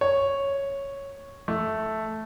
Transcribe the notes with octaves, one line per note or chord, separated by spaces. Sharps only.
C#5
A3